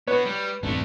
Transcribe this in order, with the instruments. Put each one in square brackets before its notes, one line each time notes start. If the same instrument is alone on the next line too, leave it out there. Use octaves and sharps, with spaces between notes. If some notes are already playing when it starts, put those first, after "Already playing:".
[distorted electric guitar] B3 F#4 [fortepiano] B4 C#5
[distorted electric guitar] G3
[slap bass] D#1 G2 C4 [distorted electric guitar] A3 D4